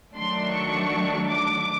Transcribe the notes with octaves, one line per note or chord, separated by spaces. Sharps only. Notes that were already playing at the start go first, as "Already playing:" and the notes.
D#3 F#3 A3 D4 C6
C#6
D6